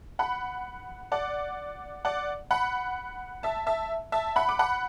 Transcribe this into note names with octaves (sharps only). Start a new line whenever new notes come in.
F#5 B5
D5 F#5
D5 F#5
F#5 B5
E5 A5
E5 A5
E5 A5
F#5 B5
D6
F#5 B5